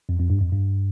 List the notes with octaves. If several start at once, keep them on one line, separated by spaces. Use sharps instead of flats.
F2
F2
G2
F2
G2